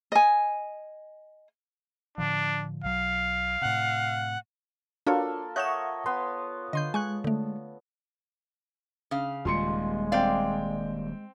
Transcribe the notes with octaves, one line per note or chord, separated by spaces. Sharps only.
D#5 G#5
A2 D3 F3 D4
B1 F#3 F5
A2 C3 F#5
A#3 D4 F4 F#4 A4 C#5
C#5 D#5 E5 F#5 C#6 F#6 G6 E7
B3 C6
D3 D#5 C6 G6
G#3 G#5 C#6 F#6
D3 A3
C#3 F5
D#1 D#2 G3 G#3 F4 C6 C#7
C4 D5 F5 G5